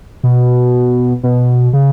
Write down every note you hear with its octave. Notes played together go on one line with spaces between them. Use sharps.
B2
B2
C#3